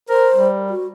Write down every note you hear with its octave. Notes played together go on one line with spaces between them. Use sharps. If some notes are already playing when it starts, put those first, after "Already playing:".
A#4 C5
G3
F#4